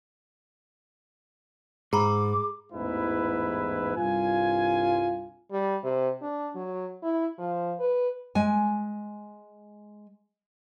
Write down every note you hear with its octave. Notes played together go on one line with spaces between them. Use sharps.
G#2 G#4 A#5 B5 D6
A1 E2 G#2 E4 B4
C2 G2 F4 G#5
G3
C3
D4
F#3
E4
F3
B4
G#3 G#5